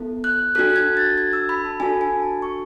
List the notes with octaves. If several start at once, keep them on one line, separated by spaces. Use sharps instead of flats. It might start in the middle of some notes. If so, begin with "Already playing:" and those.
Already playing: B3 E4 A4
F#6
D4 F#4 A4 F#6
F#6
G#6
A6
G#6
E6
B5
A5
D4 F#4 A4 G#5
G#5
A5
C#6